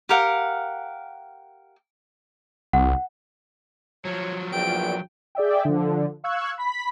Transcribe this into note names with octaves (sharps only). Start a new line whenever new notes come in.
G4 A#4 F5 F#5
C2 F#5
F3 F#3 C#5
A#1 E2 A#2 G5 D7
G#4 D5 E5 G5
D3 F3
F5 C#6 E6 F#6 G#6
B5 B6